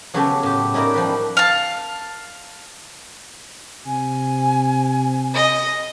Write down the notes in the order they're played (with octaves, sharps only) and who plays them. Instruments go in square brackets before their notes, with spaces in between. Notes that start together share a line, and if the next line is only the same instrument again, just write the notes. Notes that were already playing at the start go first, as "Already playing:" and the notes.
[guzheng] C#3 F#3 B3 C#4 G4 A4
A2 G4
C#4 D#4 E4 A#4 D5
F3 G3 B4
[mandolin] F5 A5
[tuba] C3 [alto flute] G#5
[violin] D#5